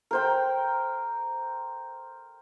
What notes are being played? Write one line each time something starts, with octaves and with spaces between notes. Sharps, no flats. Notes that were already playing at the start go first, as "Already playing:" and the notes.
A#4 C5 G5